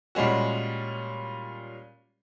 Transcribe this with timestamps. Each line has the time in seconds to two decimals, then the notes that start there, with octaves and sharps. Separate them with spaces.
0.15 A#2 G3 G#3 C#4 F#4